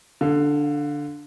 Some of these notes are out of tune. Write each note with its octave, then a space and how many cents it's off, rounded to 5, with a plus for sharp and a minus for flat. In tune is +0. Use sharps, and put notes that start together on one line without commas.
D3 +0 F5 +20